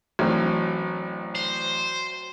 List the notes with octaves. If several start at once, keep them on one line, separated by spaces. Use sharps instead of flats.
A1 F#3 C4 D4
C5